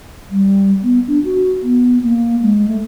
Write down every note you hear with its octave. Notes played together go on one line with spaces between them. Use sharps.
G3
B3
D4
F#4
B3
A#3
G#3
A3